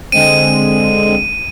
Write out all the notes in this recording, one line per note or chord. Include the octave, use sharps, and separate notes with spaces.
D3 G#3 C4 D#7